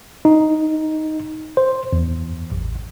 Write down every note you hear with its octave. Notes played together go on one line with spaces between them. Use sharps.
D#4
C5
E2
A1